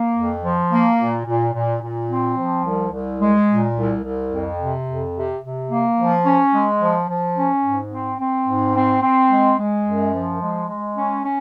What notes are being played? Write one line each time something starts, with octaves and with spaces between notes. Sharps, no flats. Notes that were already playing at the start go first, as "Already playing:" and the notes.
Already playing: A#3
F2
F3
A#3
A#2
A#2
A#2
A#2
C4
F3
C2
C2
G#3
A#2
C2
C2
F2
C3
F2
C3
C3
A#3
F3
C#4
G#3
F3
F3
C#4
G#2
C4
C4
G#2
C4
C4
G#3
G#3
F#2
F3
G#3
G#3
C#4
C#4